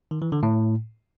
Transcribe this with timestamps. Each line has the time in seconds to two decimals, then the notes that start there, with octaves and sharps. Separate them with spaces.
0.11 D#3
0.22 E3
0.32 D3
0.43 A2